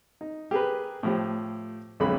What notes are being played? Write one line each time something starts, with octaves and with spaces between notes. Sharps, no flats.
D#4
G4 G#4 A#4 B4
A2 F3 G4
B1 F2 D3 G#3 B5